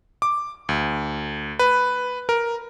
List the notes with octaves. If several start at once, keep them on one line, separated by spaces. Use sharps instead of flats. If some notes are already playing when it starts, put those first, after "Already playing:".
D6
D2
B4
A#4